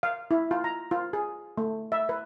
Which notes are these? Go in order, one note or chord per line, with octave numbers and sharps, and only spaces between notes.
F5
E4
F4
A#5
F4
G#4
A3
E5
B4